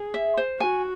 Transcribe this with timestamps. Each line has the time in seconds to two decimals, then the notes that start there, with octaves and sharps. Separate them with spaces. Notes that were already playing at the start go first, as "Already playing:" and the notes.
Already playing: G#4
0.14 E5
0.37 C5
0.60 F#4 G#5